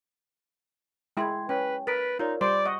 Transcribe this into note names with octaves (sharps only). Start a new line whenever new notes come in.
G#3 E4 G5 C6 G#6
C#4 B4 G5
A#4 B4 A6 B6 D7
D#4 F4 A#4 C#5 D5
G3 C5 D5 C6 D7
D#5 F#5 C#6